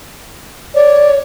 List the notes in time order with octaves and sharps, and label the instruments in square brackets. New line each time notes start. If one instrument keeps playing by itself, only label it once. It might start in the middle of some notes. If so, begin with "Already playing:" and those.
[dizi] C#5 [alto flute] D5